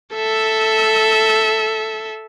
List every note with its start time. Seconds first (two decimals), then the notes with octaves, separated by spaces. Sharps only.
0.14 A4 E5